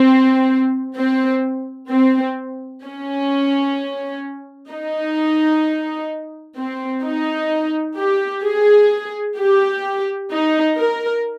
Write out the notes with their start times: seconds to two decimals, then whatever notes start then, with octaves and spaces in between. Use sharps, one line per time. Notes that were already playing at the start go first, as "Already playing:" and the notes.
Already playing: C4
0.97 C4
1.90 C4
2.84 C#4
4.70 D#4
6.58 C4
7.04 D#4
7.97 G4
8.44 G#4
9.37 G4
10.32 D#4
10.77 A#4